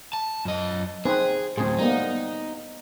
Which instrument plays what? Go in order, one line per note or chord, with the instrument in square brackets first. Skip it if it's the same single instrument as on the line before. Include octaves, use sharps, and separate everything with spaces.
[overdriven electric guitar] A5
F#2 D#5
[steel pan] C4 D#4 B4 [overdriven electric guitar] G#4
[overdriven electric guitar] D2 A2 [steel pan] C4 G#4
[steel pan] G3 A#3 B3 [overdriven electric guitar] D#4